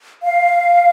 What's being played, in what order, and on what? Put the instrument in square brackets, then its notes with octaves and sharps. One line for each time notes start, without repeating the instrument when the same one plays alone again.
[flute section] F5